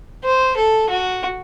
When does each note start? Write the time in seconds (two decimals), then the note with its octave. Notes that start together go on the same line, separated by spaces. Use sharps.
0.24 C5
0.57 A4
0.90 F#4